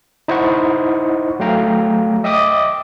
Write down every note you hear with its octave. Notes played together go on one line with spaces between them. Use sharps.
D#4 E4 C5 D#5 F#5 C#6
F#3 A3 F5 G5 A#5
D#5 E5 G5 D6 D#6